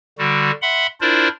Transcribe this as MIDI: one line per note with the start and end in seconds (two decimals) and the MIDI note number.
0.18 0.51 50
0.18 0.51 55
0.18 0.51 66
0.62 0.87 76
0.62 0.87 78
0.62 0.87 83
0.62 0.87 84
1.01 1.28 62
1.01 1.28 64
1.01 1.28 65
1.01 1.28 70
1.01 1.28 72
1.01 1.28 74